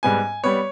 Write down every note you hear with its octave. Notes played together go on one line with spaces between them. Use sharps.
G#2 G3 B3 G#5
G3 B3 C#5